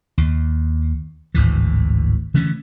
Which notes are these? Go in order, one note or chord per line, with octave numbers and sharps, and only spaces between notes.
D#2
G#1 D2 A2 E3
D3 E3 A3 C#4